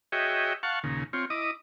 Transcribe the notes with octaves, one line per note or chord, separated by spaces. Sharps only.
F#4 G#4 C#5 D#5 E5 G5
F5 F#5 A5 C#6
D#2 A#2 C#3
C4 F4 C#5
E4 D#5 D6 D#6